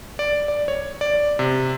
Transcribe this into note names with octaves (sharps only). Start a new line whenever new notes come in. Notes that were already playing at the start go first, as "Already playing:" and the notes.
D5
D5
C#5
D5
C3